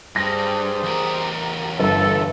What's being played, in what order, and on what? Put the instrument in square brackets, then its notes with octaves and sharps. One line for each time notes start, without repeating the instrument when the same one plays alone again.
[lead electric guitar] G2 [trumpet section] G3 G#4 C5 [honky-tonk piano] A#6
[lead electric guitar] E2 A#4
[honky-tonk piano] G1 [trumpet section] A4